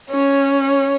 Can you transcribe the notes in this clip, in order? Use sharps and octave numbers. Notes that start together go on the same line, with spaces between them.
C#4 C#5
C#5